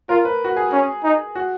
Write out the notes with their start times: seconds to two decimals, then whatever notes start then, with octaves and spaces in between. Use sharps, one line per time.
0.09 F4 A#4
0.25 B4
0.44 F#4
0.57 G#4
0.72 C#4
1.04 D#4
1.35 F#4